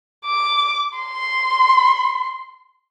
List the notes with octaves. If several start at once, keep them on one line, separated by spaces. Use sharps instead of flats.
D6
C6